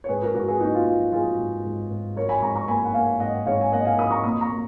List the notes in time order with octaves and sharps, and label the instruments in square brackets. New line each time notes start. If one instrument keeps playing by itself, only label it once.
[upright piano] C#5
G#2 G#4 B4
F#4 A#4
G#2 F#4 A#4
G#4 B4
A#3 D#4 F#4
F4
F#3 F4
F#3 F4 G#4
G#2
G#2
G#2
F#3 A#4 C#5
G#5 B5
G#2 A#5 C#6
A#5 C#6
A#3 G#5 B5
F#5
A#3 F5 G#5
G#2 D#5 F#5
G#2 C#5 F5
G#5
A#3 D#5 F#5
F5 G#5
F#3 B5 D#6
A#5 C#6
A#2 B5 D#6
A#5 C#6
A#2